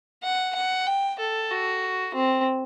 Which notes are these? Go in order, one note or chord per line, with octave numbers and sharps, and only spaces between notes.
F#5
F#5
G5
A4
F#4
C4